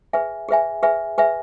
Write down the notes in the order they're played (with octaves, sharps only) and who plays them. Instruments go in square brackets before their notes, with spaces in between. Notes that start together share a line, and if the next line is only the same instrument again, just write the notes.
[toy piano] G#4 B4 E5 G#5
G#4 B4 E5 G#5
G#4 B4 E5 G#5
G#4 B4 E5 G#5